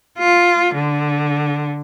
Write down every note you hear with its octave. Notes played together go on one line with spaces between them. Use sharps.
F4
D3